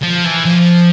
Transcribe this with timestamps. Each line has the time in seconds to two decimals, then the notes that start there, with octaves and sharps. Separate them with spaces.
0.02 F3
0.24 E3
0.45 F3